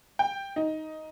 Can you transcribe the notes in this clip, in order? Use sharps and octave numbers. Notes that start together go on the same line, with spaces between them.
G5
D#4